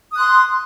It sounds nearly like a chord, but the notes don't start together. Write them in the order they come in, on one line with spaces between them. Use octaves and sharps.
D#6 F#6 C6